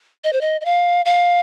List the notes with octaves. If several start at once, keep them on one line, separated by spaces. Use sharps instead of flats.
D#5
C5
D#5
D#5
F5
F5